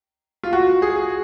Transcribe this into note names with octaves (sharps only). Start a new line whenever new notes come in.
F4
F#4
G#4